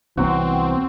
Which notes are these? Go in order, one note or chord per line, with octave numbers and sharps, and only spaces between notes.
C2 E3 F#3 B3 C4 F#4